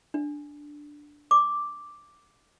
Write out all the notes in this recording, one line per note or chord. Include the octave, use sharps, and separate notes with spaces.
D4
D6